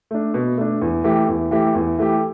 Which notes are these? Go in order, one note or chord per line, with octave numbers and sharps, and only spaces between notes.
A3 D4
B2
A3 D4
E2
E3 A3 G4
E2
E3 A3 G4
E2
E3 A3 G4